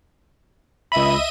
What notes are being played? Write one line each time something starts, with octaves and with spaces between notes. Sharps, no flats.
C#2 D#5 E5 B5 D#7